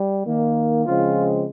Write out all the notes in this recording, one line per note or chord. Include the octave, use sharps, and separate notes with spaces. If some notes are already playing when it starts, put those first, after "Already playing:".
Already playing: G3
D#3 A#3
C#3 F3 G#3 C4 F4